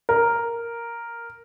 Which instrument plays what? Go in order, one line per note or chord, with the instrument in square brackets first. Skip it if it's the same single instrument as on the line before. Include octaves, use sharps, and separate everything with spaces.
[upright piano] A#4